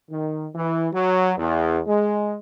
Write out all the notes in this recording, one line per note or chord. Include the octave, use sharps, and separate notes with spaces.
D#3
E3
F#3
E2
G#3